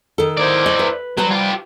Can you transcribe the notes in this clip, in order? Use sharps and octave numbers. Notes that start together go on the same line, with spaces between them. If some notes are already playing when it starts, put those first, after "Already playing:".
D#3 A4
E4 C5 D5
D#5
B4
F#3 G3 B4 C5 A5
F4 G4